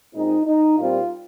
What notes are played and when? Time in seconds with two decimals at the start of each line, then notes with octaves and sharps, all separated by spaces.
0.14 A#2 G#3 C4 D#4
0.46 D#4
0.77 A#2 G3 C4 F4